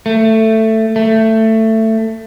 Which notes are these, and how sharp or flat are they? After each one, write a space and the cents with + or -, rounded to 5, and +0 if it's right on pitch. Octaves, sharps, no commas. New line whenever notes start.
A3 +10
A3 +15